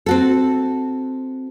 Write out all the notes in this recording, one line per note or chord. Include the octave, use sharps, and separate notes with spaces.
C4 F#4 A4